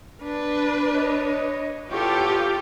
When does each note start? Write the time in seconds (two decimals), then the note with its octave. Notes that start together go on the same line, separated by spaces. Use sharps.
0.24 D4 B4
0.93 C#5 D#5
1.91 E2 A2 F4 G4 A4 C#6